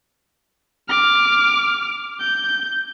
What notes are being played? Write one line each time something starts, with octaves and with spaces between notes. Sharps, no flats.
D6 F6
G6